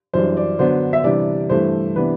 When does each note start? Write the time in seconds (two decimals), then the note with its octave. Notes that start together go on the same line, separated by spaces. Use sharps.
0.13 F#2 E3 G3 D4 C5
0.37 D5
0.59 D3 F#3 B3 D4 C5
0.93 E5
1.04 C3 E3 G3 D4 D5
1.50 G2 E3 A3 C5
1.96 C3 E3 B3 D4 B4